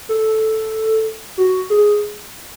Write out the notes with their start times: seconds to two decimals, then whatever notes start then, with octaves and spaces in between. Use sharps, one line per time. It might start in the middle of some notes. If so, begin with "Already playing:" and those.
0.09 A4
1.38 F#4
1.70 G#4